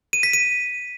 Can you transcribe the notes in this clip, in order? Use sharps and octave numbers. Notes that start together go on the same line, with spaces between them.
D#7
B6
D#7